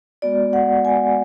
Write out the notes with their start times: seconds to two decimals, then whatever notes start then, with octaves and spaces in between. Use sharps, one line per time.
0.22 G#3 B3 F#4 D5
0.53 F#5
0.85 G#5